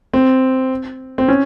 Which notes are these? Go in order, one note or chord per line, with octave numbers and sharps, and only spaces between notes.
C4
C4
C#4